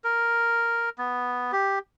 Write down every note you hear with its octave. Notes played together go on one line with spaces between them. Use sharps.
A#4
B3
G4